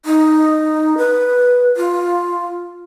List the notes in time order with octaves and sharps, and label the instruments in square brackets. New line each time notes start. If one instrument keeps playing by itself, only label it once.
[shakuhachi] D#4
B4
F4